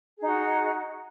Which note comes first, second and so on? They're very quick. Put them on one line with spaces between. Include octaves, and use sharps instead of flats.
G#4 D#4 F#4